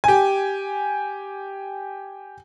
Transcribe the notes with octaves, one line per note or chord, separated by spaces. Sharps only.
G4 G#5